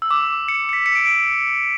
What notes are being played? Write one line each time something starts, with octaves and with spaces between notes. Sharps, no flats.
E6
D6
C#7
C#7
B6
C#7
D7